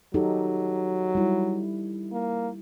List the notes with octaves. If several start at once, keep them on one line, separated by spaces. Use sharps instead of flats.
F#3 D#4 G4 A4
G3 E4
A#3